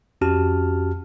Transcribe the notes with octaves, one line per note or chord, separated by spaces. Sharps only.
F2 C#4 F#4 G4 A5 F6